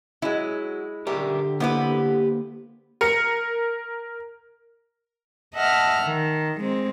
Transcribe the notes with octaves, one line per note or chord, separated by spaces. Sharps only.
F#3 G#3 E4
D3 G4 A#4 D5 E5
A#3 B3 E4 G4 B4 C5
A#4 C#7
D#5 E5 F#5 A5 F6
D#3
G#3 C4